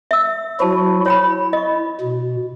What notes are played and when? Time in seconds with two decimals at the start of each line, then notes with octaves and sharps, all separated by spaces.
0.11 E5 E6
0.60 F#3 E4 F#4 C5 A5
1.06 E4 C#5 G5 B5
1.53 D#5 C#6
2.01 B2